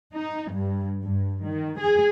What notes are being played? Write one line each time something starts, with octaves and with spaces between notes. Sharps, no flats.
D#4
G2
G2
D#3
G#4